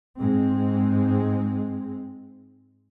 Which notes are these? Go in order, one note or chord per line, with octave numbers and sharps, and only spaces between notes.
G#2 G#3 C4